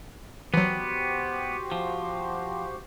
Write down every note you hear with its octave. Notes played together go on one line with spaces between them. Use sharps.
E3 F#3 B3 F#4 G4 C5
F3